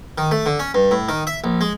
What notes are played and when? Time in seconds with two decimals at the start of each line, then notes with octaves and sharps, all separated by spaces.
0.18 D#3
0.31 A3
0.46 D3
0.59 C#4
0.74 G2
0.91 A2
1.09 D#3
1.27 E5
1.44 A#1
1.61 G#3